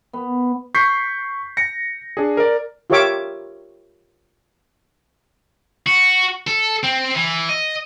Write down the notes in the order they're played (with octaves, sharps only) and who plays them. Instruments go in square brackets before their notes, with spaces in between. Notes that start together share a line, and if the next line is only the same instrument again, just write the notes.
[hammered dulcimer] B3
[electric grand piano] C#6 G6 B6 C7
A#6 C#7
D4 G#4
A#4 D5
[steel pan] F4 G4 A#4 C#5 E5 D6
[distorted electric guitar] F#4
A4
C4
E3
D#5